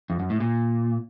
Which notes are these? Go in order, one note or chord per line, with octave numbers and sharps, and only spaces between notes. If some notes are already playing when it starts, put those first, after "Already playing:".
F2
F#2
A2
A#2